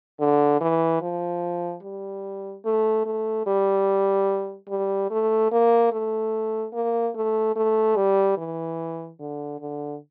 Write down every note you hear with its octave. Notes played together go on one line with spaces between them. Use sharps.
D3
E3
F3
G3
A3
A3
G3
G3
A3
A#3
A3
A#3
A3
A3
G3
E3
D3
D3